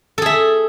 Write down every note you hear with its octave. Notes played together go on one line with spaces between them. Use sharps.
G#4 A4 E5